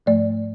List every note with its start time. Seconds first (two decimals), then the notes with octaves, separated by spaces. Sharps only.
0.06 G#2 F3 A3 D5